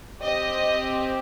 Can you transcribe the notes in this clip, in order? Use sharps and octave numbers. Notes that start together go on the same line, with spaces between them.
C4 G4 D#5